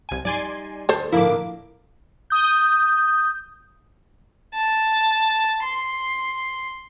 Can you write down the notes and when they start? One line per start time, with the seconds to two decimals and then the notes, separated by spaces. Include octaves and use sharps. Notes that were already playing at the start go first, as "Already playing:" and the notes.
0.09 C2 G#5
0.25 G3 D#4 D5 G#5 C6
0.89 D2 A4 C5
1.12 A2 D3 F3 A#3 E4 D6
2.30 D#6 G6
4.54 A5
5.63 C6